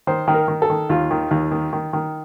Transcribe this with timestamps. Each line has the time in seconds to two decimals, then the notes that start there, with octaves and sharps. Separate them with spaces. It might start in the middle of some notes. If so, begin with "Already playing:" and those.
0.07 D#3 C5
0.28 D#3
0.34 A#4
0.48 D#3
0.62 A4
0.70 D#3
0.89 D#2 F4
1.11 D#3
1.31 D#2
1.51 D#3
1.73 D#3
1.93 D#3